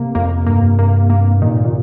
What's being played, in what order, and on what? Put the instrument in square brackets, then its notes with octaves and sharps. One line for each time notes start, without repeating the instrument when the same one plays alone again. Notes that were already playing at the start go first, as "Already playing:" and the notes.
Already playing: [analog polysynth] C3 A#3
[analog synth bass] F2 [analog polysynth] A#3
[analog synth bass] G2 [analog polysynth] A#3
[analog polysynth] A#3
A#3
[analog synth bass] A#2 [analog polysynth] D#3
[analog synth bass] A#2